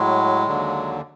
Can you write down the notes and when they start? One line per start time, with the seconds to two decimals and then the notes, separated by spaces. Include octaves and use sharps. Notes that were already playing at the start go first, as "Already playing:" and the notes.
Already playing: A2 F#3 G#3
0.47 D#2 D3 F#3